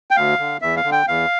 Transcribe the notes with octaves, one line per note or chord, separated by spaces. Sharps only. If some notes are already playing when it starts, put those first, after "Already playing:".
G5
D2 F5
D3
E2 E5
F5
D3
G5
E2 F5